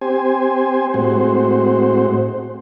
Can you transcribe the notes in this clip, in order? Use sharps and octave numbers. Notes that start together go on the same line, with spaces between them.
C4 G4 C5 G#5
A2 G#3 C4 F#4 C5